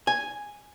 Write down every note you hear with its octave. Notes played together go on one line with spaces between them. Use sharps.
G#5